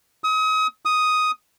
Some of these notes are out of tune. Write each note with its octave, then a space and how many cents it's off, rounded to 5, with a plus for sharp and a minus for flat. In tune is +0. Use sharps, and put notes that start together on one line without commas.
D#6 +35
D#6 +5